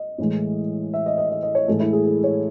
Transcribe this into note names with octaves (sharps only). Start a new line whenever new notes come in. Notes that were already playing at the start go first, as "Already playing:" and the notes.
Already playing: D#5
A2 E3 G#3
E5
D#5
D#5
D#5
D#5
C#5
A2 E3 G#3 A4
E4
G#4
G#4
C#5